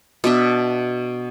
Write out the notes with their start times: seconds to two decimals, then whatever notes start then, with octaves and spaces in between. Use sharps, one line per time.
0.24 B2 D4 E5